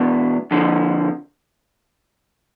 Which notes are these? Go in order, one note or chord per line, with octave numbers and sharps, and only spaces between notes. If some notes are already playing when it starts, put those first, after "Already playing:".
Already playing: E2 B2 B3 D4
F2 D3 F3